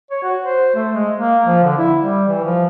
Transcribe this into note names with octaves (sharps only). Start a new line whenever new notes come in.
C#5
F#4
C5
A3
G#3
A#3
F3
D3
E4
G3
E3
F3